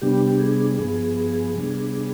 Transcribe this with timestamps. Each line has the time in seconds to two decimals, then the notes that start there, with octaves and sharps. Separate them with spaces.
0.02 C3 G3 B3 D4 G4
0.39 G#4
0.78 G2 F3 B3 G#4
1.56 C3 G3 B3 D4